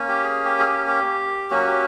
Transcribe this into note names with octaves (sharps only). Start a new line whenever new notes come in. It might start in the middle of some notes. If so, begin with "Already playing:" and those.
Already playing: A#3 C#4
G4
G#4
G4
G#4
G4
G4
F#3 A#3 C#4 F#4
G4